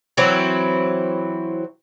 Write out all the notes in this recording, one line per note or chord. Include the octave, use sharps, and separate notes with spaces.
E3 F#3 C4 E4